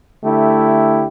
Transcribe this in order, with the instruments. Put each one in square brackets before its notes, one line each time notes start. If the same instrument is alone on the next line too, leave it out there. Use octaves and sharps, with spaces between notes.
[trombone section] D3 A3 E4 G4